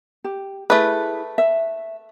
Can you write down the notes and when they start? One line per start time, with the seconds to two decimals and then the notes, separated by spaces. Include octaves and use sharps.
0.24 G4
0.70 A3 E4 G#4 B4
1.38 E5